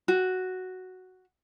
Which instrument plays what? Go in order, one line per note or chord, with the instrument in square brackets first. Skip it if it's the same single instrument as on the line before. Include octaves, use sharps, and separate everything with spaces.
[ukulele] F#4